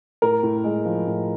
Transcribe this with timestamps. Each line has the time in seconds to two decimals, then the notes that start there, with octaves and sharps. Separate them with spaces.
0.22 A2 A#4
0.43 A2
0.64 G#3
0.85 F3
1.07 A2